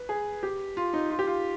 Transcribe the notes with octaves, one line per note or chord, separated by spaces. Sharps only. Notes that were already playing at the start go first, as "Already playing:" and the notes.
Already playing: B4
G#4
G4
F4
D#4
F4
G4
F4